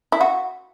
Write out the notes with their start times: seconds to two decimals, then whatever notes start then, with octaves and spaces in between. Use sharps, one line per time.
0.12 E4
0.21 F#4